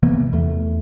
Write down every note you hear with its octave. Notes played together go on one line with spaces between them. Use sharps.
C3 E3 A#3 B3
E2 A3